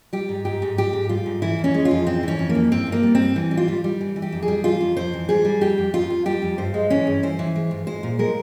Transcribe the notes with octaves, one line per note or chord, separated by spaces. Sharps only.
G3 G4
G#2
G#2 G4
G#2
G#2 G4
G#2
G3 F4
G#2
E3 E4
F2
C#4
G#3
F4
F2
E3 C4
E3 C#4
F2
A#3
F2
G2 C4
G2
A#3
G3
G2 C4
E3
G3
F4
G3
G3
E3
E3
G4
F2
G#4
G3
E3 F4
F2
F2 C5
E3
G3 G#4
G3
F2 G4
F2
F2 F4
F2
G3 G4
F2
G2 C5
G#3
E3 C#4
G2
E3 C5
E3
G#3
G2
G#3 C5
A#2
G#3 A#4